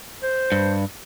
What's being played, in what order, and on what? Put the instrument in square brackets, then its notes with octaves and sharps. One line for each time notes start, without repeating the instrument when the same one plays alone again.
[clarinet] C5
[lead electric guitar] G2